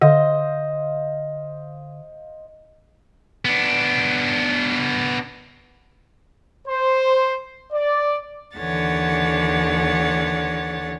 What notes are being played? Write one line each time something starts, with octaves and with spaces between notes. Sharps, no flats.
D3 C5 D#5 F5
B3 D4
C5
D5
D#2 D3 E3 C#5 F#5 A6